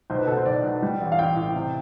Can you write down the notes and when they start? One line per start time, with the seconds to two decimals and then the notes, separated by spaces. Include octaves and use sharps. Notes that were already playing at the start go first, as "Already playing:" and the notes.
0.10 B1 C5
0.19 B4
0.27 B2 A4
0.37 C5
0.46 B1 D5
0.63 B1
0.82 G3
1.00 A1
1.12 F5
1.18 A1 G5
1.36 A2
1.55 C3